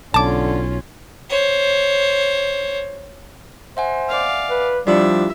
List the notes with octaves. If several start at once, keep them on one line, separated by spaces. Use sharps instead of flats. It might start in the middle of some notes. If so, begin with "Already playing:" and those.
B1 D3 C#4 F4 A5 D6
C5 C#5
C5 E5 F#5 G#5
D5 F5
B4
F3 G3 D4 E4 F4 G4 E5